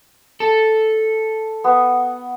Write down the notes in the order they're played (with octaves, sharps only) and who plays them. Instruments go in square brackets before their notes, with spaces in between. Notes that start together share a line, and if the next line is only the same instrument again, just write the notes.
[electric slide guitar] A4
[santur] B3